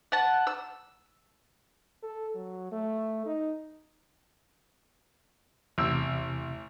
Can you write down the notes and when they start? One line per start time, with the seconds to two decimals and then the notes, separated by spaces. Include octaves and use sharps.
0.12 F#5 A5
0.47 E6
2.03 A4
2.35 F#3
2.72 A3
3.26 D#4
5.78 A1 E2 C3 E6